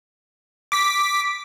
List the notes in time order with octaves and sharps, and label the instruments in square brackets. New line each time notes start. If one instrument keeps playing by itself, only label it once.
[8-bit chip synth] D6 B6